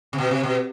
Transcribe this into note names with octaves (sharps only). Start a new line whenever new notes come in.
C3
B2
C3
B2